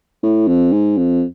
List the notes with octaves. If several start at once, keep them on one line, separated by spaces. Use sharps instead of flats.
A2
F2
G#2
F2